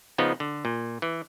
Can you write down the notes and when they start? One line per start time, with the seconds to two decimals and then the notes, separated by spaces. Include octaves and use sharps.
0.18 C#3 F3 B3 D#4
0.40 D3
0.65 A#2
1.02 E3